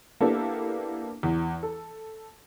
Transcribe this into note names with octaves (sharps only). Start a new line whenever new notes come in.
A#3 B3 D4 E4 G4 A4
E2
A4